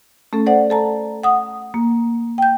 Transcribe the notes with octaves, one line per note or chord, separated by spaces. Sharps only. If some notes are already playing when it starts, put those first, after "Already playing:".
A3 C#4 A4
A4 C5 D5 F#5
A4 A5 A#5
F#5 D#6
A#3
G5 G6